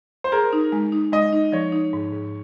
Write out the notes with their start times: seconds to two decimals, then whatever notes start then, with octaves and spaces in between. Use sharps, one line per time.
0.24 C5
0.32 G#4 A#4
0.53 D#4
0.72 G#3
0.92 D#4
1.12 G#3 D#5
1.32 D#4
1.52 F3 C#5
1.72 D#4
1.93 G#2
2.13 G#2